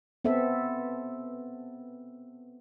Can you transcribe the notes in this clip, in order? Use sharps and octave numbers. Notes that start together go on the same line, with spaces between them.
B3 C4 A4 E5